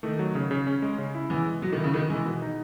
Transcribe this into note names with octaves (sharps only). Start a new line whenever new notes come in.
D#3 A3
F#3
C#3
C#3
C#4
G#3
C#3
E4
E3 B3
G#3
B2 F#3
D#3
E4
C#3
D#3 B3
E3 G#3
B2
D#4